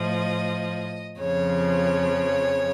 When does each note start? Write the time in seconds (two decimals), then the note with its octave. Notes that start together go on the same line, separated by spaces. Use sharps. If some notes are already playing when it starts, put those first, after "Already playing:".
Already playing: A2 F3 D#5
1.19 F2 C#3 F3 C#5